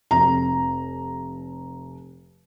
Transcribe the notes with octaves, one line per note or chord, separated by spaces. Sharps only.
F1 A#5